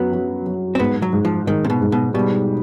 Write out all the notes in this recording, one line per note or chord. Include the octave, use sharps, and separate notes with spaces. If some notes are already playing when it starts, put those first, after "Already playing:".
Already playing: F#2 F#3 B3
F#3
F#3
C4
G#2 B3
F#3
G#2
F3
G#2 D#3
C3
B2
G#2
B2
B2 G3